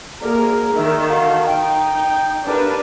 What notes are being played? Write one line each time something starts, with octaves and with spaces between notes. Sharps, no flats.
D2 A#3 G#4 A#4 D5
D#3 A#4 D#5 E5
F#4 A4 F5
D#4 G5
E2 G2 D4 A#4 B4